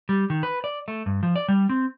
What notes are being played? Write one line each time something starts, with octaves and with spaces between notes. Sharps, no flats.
G3
D#3
B4
D5
A3
G2
F3
D5
G3
C4